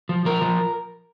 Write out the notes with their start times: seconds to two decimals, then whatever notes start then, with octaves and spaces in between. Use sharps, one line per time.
0.09 F3
0.25 F3 A#4
0.41 F3